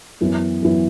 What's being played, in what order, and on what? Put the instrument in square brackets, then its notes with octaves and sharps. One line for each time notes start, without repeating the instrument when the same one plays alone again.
[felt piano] F#2 E3 B3
F#2 E3 B3